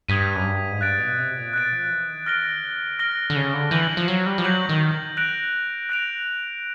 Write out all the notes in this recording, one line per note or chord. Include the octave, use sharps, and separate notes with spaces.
G2 D#6 G#6 B6 D#7
F#2
G2
G#2
G2 F#6 A6 D7
B2
C3
A#2
B2 F#6 A6 D7
F3
E3
D#3
E3 F6 A#6 D7 G7
D#3
C#3
D3
C3 F6 A#6 D7 G7
D3
C#3
D3
C#3
D3
E3 G6 A#6 D#7 F#7
F3
F#3
G3
F3
F#3 G6 A#6 D#7 F#7
D#3
F#6 A#6 D7 F7
F#6 A#6 D7 F7